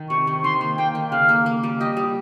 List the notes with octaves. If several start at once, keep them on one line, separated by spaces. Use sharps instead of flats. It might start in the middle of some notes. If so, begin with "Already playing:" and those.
Already playing: D#3
C3 C#6
D#3
D#3 C6
A#3
A#3 G5
D#3
C#3 F5
A#3
A#3
G3
G4 D#5
G3